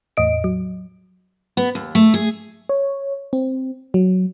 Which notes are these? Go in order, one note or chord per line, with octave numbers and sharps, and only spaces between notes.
E2 A2 D#5 D7
F#3
B3
D#2
A3
G#4
C#5
C4
F#3